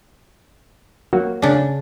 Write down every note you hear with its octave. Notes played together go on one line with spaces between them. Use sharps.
F#3 A#3 F#4
C#3 D4